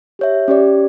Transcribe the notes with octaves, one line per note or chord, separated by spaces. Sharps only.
G4 C#5 E5
C#4 G4 D5